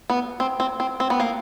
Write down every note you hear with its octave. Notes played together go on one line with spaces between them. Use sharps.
B3
C4
C4
C4
C4
B3
A#3